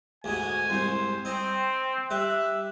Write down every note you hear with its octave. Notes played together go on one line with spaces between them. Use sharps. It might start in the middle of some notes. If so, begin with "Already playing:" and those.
D2 G#2 B2 G#5
C2 G#2 C5
C4 D#4 C5 G5
G3 E5 F#6